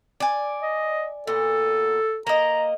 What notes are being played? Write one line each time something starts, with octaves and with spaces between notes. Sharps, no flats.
D5 G#5
D#5
A#2 B3 A4
A#3 D#5 A#5